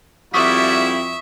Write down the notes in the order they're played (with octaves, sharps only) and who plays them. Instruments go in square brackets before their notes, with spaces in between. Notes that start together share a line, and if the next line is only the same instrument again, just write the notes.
[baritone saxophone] F2 [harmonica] G3 E4 F#4 [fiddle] E5 [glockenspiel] C#6 D#6 B6